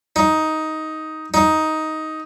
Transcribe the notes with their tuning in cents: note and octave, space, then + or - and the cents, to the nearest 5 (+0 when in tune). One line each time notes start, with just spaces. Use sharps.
D#4 +10
D#4 +10